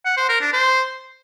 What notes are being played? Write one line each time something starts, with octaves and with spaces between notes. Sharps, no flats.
F#5
C5
A#4
D4
C5